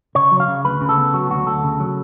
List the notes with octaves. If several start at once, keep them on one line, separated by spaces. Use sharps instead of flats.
C#3 C#5
F#3
F5
C#3
D2 B4
C#3
A4
B3
F#3 F#4
D2 F#4
D2 A4
C#3
F#3